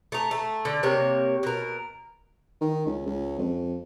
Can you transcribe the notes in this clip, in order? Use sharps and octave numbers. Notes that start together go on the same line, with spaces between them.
A3 A#5
A3
D3
C3 A#3 A#4 C#5
B2 A#4
D#3
C#2
C#2
F2